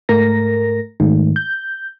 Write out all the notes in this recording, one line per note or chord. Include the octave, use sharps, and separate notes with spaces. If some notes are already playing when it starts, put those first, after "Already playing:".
G#2 A3 A#4 A#6
G#2 D#3 G#3 A3
G6